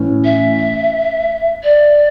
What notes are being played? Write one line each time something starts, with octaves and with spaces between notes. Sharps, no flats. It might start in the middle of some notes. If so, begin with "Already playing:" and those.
Already playing: A2 E3 C#4
E5
D5